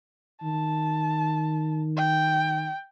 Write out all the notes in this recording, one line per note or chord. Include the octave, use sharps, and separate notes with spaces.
D#3 A5
G5